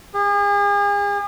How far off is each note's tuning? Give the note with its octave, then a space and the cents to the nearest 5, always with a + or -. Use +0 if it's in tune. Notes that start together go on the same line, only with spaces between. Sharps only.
G#4 -40